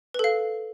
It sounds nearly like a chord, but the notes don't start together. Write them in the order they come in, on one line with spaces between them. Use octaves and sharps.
B4 A4 F5